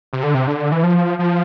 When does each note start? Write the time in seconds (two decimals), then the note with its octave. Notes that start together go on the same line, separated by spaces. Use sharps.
0.13 C3
0.23 D3
0.34 C3
0.47 D3
0.72 E3
0.83 F3
1.19 F3